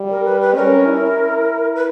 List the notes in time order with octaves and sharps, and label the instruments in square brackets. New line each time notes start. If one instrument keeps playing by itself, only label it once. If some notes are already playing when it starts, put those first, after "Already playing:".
Already playing: [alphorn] G3
[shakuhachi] A#4
B4
B4
[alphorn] C#4 [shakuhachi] A#4
[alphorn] E4
[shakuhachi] B4